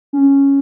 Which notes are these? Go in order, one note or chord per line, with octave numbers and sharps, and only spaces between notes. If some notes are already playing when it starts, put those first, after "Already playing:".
C#4